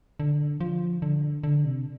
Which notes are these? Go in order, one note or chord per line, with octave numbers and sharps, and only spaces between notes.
D3
F3
D3
D3
C3